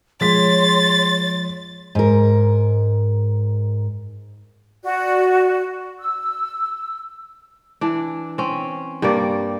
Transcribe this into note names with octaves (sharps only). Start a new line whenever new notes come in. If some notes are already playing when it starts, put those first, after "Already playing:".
F3 G#3 C#5 C6 A6 B6
G#2 A#4
F#4 D5
E6
E3 D4
C4 C#4
G2 G3 A#3 D5